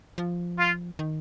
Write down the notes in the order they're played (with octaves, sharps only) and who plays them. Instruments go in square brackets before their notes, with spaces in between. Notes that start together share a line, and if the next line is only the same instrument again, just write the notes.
[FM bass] F3
[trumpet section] F4
[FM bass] D#3